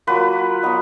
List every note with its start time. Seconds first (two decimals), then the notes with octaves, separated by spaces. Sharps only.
0.07 F#3 A#3 F4 B4
0.63 F#3 B3 D#4